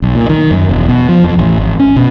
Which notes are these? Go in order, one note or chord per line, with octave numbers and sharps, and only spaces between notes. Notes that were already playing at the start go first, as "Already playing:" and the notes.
B1
A#2
D#3
F#2
E1
B2
F3
F2
A1
G#1
C#4
B2